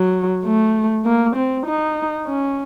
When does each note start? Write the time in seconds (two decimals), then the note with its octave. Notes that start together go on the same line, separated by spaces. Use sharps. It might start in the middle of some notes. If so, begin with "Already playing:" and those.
Already playing: F#3
0.45 A3
1.05 A#3
1.36 C4
1.66 D#4
2.27 C#4